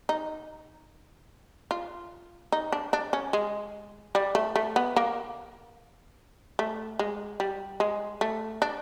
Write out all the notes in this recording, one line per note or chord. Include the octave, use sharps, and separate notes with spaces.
D#4
F4
D#4
D4
D4
C#4
G#3
G3
A3
A3
B3
A#3
A3
G#3
G3
G#3
A3
D4